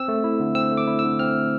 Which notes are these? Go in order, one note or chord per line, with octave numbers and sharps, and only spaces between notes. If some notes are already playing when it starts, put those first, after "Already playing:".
Already playing: C4 E6
A3
E4
D3
C4 E6
A3
D6
E4
E6
D3
C4 F6
A3